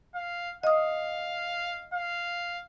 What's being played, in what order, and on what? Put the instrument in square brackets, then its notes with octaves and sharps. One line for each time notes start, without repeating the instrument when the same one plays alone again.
[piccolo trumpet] F5
[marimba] D#5 D#6 [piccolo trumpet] F5
[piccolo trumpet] F5